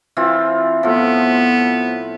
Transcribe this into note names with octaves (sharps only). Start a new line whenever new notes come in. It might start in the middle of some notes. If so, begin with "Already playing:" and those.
E3 C4 F4
A2 F3 B3